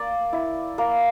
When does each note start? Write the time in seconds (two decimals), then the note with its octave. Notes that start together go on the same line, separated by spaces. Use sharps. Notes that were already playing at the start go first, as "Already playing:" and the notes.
Already playing: A#3 D5
0.33 E4
0.78 A#3